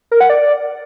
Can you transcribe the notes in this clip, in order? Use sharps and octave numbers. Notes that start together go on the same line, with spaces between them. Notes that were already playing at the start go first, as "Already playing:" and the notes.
A#4
F#5
D5